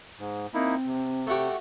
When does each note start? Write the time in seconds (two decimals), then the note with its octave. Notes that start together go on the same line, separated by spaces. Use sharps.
0.19 G#2
0.54 A#3 C4 D#4 E4
0.86 C3
1.27 A3 F#4 G4